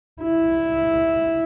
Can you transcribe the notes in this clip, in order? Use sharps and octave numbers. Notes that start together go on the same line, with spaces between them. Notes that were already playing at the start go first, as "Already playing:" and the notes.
E4